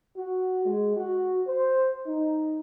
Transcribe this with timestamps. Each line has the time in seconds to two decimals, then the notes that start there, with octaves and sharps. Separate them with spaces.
0.17 F#4
0.65 G#3
0.96 F#4
1.48 C5
2.06 D#4